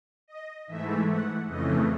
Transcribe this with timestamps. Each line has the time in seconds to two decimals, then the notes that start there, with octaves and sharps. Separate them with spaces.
0.28 D#5
0.67 G#2 E3 A3 E5
1.08 F#5
1.47 F2 C#3 E3 A3 D#5